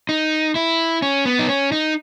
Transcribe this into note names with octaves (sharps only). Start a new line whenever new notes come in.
D#4
E4
C#4
B3
D#4
C#4
D#4